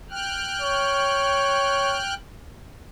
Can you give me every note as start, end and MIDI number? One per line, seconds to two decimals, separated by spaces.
0.10 2.14 79
0.10 2.14 89
0.10 2.14 90
0.62 1.99 73